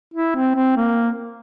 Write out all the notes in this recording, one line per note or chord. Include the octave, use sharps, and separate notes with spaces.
E4
C4
C4
A#3